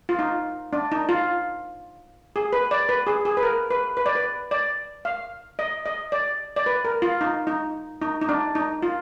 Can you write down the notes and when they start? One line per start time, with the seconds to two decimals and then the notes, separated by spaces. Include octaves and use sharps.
0.09 F4
0.19 D#4
0.73 D4
0.92 D#4
1.09 F4
2.36 G#4
2.53 B4
2.71 D5
2.89 B4
3.07 G#4
3.25 G#4
3.37 B4
3.43 A#4
3.71 B4
3.97 B4
4.06 D5
4.15 B4
4.51 D5
5.05 F5
5.59 D#5
5.86 D#5
6.12 D5
6.56 D5
6.66 B4
6.85 A#4
7.02 F4
7.21 D#4
7.47 D#4
8.01 D#4
8.21 D#4
8.29 D4
8.55 D#4
8.83 F4